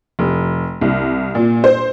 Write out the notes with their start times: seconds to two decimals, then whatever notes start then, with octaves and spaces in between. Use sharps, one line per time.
0.19 F1
0.81 C2
1.35 A#2
1.64 C5